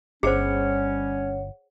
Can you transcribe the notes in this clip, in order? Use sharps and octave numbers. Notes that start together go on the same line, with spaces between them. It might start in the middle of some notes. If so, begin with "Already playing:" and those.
G1 G3 C#4 G#4 C5 C#5 F#5